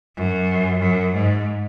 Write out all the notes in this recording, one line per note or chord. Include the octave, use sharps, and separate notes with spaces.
F#2
F#2
G#2